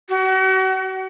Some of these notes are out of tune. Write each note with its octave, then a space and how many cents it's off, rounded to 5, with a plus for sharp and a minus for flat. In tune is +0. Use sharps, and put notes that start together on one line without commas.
F#4 +35